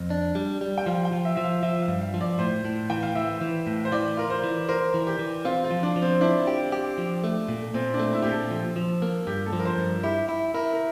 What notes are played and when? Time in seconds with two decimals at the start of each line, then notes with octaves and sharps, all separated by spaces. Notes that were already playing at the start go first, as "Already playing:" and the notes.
Already playing: F2
0.10 D4
0.35 G3
0.61 G3
0.78 G5
0.86 F3 F5
1.05 G5
1.12 F3
1.25 E5
1.36 F3 E5
1.44 F5
1.63 F3 E5
1.82 F5
1.88 G2
2.01 F5
2.14 F3
2.21 D5
2.39 A2 C5
2.65 A2
2.90 E3 G5
3.03 F5
3.15 E3 E5
3.41 E3
3.67 A2
3.85 C5
3.92 E3 D5
4.17 F4 A#4
4.30 C5
4.43 E3
4.69 A#4 C5
4.94 E3
5.07 G4
5.19 E3
5.45 C4 F4
5.64 F4
5.71 F3
5.83 D4
5.96 F3
6.02 C4
6.21 D4 E4
6.47 G4
6.72 G4
6.98 F3
7.24 A3
7.48 A#2
7.74 A#2 C4
7.94 D4
7.99 A3
8.13 E4
8.22 A#2 G4
8.31 A4
8.51 F3
8.76 F3
9.02 A#3
9.27 G2 G4
9.46 A4
9.53 F3
9.59 A#4
9.65 C5
9.78 G2
10.03 E4 G4
10.29 E4
10.54 E4 A#4
10.73 A#4